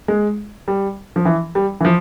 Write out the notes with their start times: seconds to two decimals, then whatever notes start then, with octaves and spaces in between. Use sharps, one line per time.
0.08 G#3
0.68 G3
1.16 F3
1.25 E3
1.55 G3
1.81 E3
1.85 F3